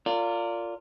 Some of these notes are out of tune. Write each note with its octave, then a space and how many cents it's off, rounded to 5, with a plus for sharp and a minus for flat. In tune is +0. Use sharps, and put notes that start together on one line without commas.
F4 +0 A#4 -30 D5 -20